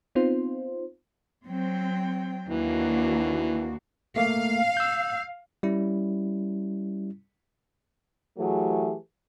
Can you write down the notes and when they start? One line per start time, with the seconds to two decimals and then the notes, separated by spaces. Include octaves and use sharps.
0.15 B3 C4 D#4 F4 C5
1.48 F#3 C4 G5
2.49 D#2 E3 A#3 D4 F#4
4.16 A3 A#3 F5
4.77 E6 G6
5.63 G3 C#4 E4
8.38 E3 F#3 A3 G4 G#4